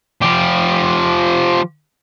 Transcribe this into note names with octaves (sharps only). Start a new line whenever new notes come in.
F3 G4